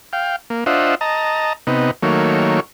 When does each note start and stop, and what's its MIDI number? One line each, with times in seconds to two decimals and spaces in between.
0.13 0.36 77
0.13 0.36 79
0.50 0.64 58
0.66 0.95 62
0.66 0.95 65
0.66 0.95 72
0.66 0.95 75
0.66 0.95 76
0.66 0.95 78
1.01 1.53 75
1.01 1.53 81
1.01 1.53 82
1.67 1.91 48
1.67 1.91 59
1.67 1.91 63
2.03 2.60 51
2.03 2.60 54
2.03 2.60 57
2.03 2.60 58
2.03 2.60 73